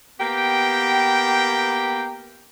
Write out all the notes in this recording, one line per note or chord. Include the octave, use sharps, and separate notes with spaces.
A#3 B3 G4 G5